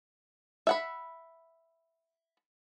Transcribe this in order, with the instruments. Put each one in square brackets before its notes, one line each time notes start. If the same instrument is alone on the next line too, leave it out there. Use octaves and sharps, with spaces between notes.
[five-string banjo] E5 F#5 B5